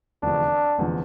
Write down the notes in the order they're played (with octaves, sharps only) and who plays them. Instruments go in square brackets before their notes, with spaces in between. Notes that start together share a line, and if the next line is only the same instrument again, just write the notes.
[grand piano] F1 E2 D3 F3 [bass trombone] D4
[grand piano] F1 E2 D3 F3